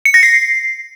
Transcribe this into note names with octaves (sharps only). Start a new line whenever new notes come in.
C#7
A#6
C7